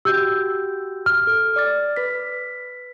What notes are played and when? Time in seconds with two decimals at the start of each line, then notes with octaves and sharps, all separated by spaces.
0.05 F#4 G4 E6 G6
1.06 F6
1.27 A4
1.56 D5 D6 A6
1.96 B4 B6